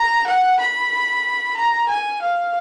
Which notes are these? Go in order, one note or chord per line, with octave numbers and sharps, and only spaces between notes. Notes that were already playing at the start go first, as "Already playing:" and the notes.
Already playing: A#5
F#5
B5
A#5
G#5
F5